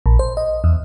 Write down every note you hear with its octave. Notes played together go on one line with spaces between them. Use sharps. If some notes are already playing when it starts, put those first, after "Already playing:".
A#1
C5
D#5
E2